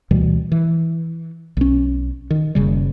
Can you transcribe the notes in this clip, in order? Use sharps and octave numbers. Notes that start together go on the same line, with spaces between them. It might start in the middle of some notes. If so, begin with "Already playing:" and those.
D2 B2 E3 G3
E3
B1 C#4
D#3
F#1 C#3 G3